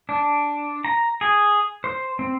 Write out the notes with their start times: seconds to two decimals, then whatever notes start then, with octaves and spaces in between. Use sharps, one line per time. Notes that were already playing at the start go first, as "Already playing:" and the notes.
0.09 D4
0.85 A#5
1.21 G#4
1.84 C5
2.19 C4